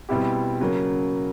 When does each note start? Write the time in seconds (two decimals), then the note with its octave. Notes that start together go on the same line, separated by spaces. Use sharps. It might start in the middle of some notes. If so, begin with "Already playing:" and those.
0.09 B2 G3 C4 E4 G4
0.60 C#3 F#3 A#3